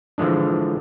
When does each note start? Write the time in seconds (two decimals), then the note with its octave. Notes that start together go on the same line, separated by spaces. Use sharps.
0.18 D3 E3 F3 G#3 D4